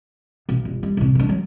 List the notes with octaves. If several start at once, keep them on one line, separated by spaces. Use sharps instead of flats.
B1
G1
G3
C2 A2
E3 D4
F#3